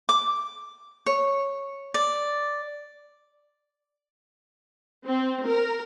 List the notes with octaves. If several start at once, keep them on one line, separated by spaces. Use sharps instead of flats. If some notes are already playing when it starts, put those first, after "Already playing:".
D6
C#5
D5
C4
A#4